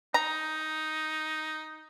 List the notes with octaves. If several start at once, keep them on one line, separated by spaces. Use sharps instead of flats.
D#4 A#5